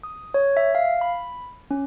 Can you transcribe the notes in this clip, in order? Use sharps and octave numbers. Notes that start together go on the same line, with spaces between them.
D#6
C#5
E5
F5
B5
C#4